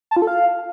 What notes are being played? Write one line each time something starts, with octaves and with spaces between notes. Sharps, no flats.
A5
F4
A4
F5